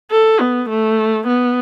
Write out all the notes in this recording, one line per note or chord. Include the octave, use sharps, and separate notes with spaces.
A4
B3
A3
B3